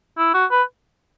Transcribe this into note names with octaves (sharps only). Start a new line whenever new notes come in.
E4
F#4
B4